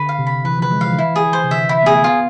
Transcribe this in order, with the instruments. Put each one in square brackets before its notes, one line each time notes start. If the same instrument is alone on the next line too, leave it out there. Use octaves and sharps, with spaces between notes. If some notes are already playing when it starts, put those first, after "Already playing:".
Already playing: [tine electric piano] D3 [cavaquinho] B4
[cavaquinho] F5
[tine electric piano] C3
[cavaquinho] B5
[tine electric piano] E3 [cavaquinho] B4
[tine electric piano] F3 [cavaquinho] B4
[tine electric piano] G#3
[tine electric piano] F3 [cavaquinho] F5
[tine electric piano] D3
[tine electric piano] E3 [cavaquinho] E4
[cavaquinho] G#4
C5
[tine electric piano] C3
[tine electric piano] D3 [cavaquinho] E5
[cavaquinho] E4
[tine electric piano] A3
[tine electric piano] B3 [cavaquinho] G#4
[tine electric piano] B3 [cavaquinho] F4